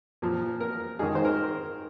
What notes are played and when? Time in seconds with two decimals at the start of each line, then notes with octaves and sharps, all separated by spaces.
0.22 A#2 F3
0.60 A#4
0.99 G#2 D#3 G#4
1.15 C5
1.25 A#4